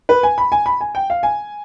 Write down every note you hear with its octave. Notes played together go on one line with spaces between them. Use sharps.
B4
G#5
B5
G#5
B5
G#5
G5
F5
G#5